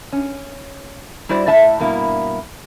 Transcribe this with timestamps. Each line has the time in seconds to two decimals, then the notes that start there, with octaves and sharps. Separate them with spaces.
0.13 C#4
1.29 G3 E4 F#4 C5 D5
1.47 A2 E5 A5
1.80 G2 B2 A#3 E4